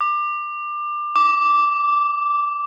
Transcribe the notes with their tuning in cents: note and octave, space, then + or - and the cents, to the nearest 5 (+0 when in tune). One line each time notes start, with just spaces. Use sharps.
D6 +25
D6 -10